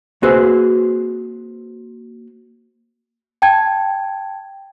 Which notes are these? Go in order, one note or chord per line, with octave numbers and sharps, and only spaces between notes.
A#3 C4 F#4 G#4 B4 C5
G5 A5 G#6